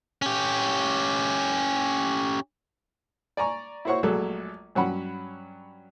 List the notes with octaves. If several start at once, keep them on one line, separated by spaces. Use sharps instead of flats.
C#4 G4
D5 G#5 A#5 C#6
E4 F#4 C5 C#5 F#5 C#6
A#1 F#3 G#3 A3 A4
G2 F#3 C#4 F#5 B5